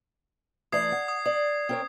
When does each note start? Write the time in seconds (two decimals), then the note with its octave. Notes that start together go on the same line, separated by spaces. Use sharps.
0.72 E3 A3 D5 D#6 G#6 C7
0.92 F#5
1.08 D#6
1.26 D5 D#6
1.69 C4 A#4 C#5